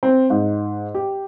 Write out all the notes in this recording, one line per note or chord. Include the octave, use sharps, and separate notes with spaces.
C4
G#2
G4